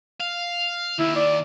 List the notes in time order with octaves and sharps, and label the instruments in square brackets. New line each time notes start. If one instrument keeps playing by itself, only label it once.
[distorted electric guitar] F5
[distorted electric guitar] D#2 D#3 [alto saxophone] E4
[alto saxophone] D5